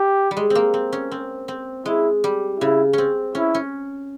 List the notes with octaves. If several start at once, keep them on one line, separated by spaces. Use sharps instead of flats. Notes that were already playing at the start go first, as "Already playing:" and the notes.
Already playing: G4
G3
G#3
C4
A#3
C4
C#4
C4
C4
G#3 E4
G3
C#3 E4
C4 C#4
C#4 E4
C#4